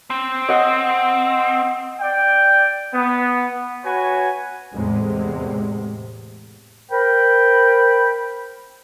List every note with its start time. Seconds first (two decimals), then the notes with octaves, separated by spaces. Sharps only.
0.10 C4
0.49 D#5 F#5
2.00 D5 G5
2.93 B3
3.83 F#4 B4 C#5 G#5
4.74 E2 A2 C3 G#3
6.91 A#4 C5 G5 B5